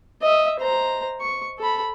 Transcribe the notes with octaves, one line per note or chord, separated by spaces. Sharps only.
D#5 E5
C5 A#5
C#6
A4 B5